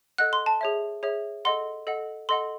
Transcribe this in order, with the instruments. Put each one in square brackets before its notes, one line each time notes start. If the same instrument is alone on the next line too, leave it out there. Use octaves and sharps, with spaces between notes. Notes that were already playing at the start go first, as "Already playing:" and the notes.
[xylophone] A4 D#5 F#5 F#6
C6
A5
G#4 C#5 E5
G#4 C#5 E5
A4 D#5 F#5 C6
A4 D#5 F#5
A4 D#5 F#5 C6